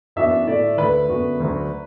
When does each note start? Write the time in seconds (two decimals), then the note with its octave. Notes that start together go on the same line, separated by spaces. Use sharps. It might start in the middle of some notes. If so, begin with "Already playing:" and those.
0.16 F#2 E3 B3 D4 F#4 E5
0.47 A2 A3 E4 D5
0.78 D2 D3 A3 B4
1.09 F#2 D3 B3 F#4
1.40 D2 D3 F#3 D4 F#4